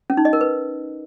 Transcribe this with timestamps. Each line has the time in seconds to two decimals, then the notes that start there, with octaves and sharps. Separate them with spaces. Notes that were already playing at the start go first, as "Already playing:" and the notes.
0.10 C#4
0.17 D#4
0.25 D#5
0.33 A#4
0.41 B4